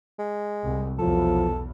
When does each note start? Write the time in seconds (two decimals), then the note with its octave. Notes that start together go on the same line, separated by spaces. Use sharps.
0.19 G#3
0.64 C2
0.99 B1 E2 F3 A4